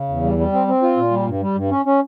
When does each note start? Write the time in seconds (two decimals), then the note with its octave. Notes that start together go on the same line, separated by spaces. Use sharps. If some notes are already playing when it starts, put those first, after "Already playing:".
Already playing: C#3
0.09 E2
0.23 G3
0.38 G3
0.52 C4
0.67 C4
0.82 F4
0.97 A#2
1.11 G3
1.26 G2
1.41 G3
1.55 G2
1.71 C#4
1.85 C#4